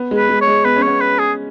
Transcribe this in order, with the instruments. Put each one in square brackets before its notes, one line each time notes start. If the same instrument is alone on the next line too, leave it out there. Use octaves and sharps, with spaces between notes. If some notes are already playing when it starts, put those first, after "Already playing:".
Already playing: [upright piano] B3
G#3
[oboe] B4
[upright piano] G#3
[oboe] C#5
[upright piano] G#3
[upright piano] B3 [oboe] B4
[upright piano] C#4
[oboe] C#5
[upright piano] B3
[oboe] B4
G#4